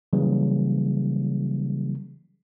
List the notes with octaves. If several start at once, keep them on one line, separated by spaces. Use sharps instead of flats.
C#3 E3 F#3 G3 A#3